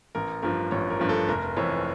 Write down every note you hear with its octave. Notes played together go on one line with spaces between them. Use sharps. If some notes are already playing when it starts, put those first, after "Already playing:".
A1 A#4
G2 F3 A#4
A1 C#5
A#4
G2 F3
A4
F1 A#4
F2 E3 C#5